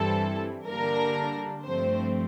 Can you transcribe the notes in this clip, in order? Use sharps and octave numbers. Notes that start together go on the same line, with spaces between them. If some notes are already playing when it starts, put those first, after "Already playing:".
Already playing: G2 E3 G3 C4 E4 A4
D3 G3 A#3 D4 A#4
G2 F3 A3 C4 C5